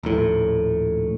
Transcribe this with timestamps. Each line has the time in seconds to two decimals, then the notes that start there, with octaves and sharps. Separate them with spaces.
0.03 D#1 A#1 A2